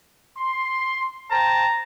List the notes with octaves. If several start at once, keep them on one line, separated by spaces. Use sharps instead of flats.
C6
C5 G5 A5 A#5